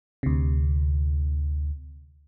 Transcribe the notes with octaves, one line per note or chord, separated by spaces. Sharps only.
D2 C3